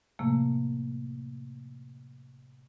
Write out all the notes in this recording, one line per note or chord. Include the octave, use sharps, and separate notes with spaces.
A2 C3 F3 A3 A#3